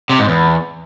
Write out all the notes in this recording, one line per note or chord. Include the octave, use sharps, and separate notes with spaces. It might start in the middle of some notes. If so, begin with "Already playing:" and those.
C3
G#2
E2